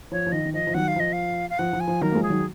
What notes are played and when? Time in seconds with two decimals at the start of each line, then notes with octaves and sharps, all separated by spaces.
0.12 F3 C#5
0.27 F3
0.32 D#3 D#5
0.45 D#3
0.54 F3 D#5
0.67 F3
0.74 D#3 F#3 F#5
0.88 F5
0.96 F3 D#5
1.13 F5
1.50 F5
1.59 F3 F#5
1.73 F3
1.80 G#5
1.88 F3
2.01 D#3 F#3 A#4
2.11 A#3
2.15 F3 G#3
2.23 G#4
2.30 D#3 F#3